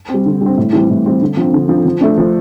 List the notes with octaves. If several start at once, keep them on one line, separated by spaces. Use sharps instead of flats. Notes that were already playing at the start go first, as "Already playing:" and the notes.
C4
G3
D3
G3 C4
A2
E3 G3 C4
A2
E3 G3 C4
D3
F3 C4
D3
F3
C4
F3
A3 D4
F3